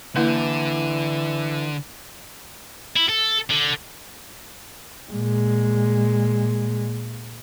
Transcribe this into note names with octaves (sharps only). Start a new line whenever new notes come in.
D3 E3 A#3 E4 B4
E4
A4
D3
A#2 G#3